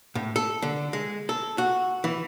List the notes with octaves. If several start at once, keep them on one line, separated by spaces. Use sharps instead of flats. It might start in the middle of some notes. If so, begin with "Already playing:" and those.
A2
A4
D3
G#3
A4
F#4
E3